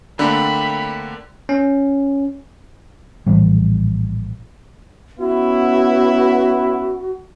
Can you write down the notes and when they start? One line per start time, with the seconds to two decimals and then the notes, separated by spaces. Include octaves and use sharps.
0.19 D3 A3 A#3 C4 D4 C5 B5
1.49 C#4
3.27 A#1 A2 E3 G3
5.19 B3 C#4 E4 F#4